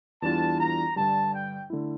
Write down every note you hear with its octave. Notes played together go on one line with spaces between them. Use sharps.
E2 E3 G3 D4 F4 A5
A#5
G2 D3 G3 A5
G5
D3 A3 E4